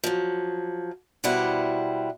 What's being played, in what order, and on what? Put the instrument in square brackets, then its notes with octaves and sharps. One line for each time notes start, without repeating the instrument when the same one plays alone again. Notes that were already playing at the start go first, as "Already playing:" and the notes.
[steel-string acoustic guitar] F3 F#3
B2 G3 E4 C5 F#5